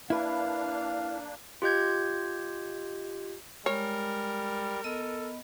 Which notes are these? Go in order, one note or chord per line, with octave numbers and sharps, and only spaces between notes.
A#3 D4 E4 B4 F5
F4 G4 D#5 G6 G#6
G3 G#3 A#4 C#5
B3 A4 D#5 B5